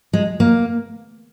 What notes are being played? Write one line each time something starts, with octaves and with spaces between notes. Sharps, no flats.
G#3
A#3